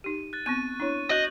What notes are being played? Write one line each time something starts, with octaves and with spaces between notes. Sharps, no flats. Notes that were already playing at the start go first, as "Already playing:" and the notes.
D#4 G4 D#7
F#6 A6
B3 C4 C#6 F#6 D#7
D4 E4 C#5
F#4 D#5 F#6 G6 F#7